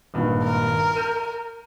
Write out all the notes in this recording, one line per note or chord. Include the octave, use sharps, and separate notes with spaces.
G#1 G2 A#2
A#4
G6 D#7